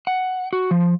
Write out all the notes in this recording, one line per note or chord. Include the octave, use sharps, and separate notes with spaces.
F#5
F#4
F3